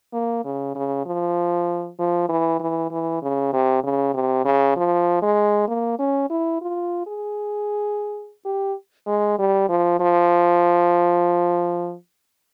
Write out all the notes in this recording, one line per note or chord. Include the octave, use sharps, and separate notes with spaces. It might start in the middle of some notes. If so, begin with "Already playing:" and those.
A#3
C#3
C#3
F3
F3
E3
E3
E3
C#3
C3
C#3
C3
C#3
F3
G#3
A#3
C#4
E4
F4
G#4
G4
G#3
G3
F3
F3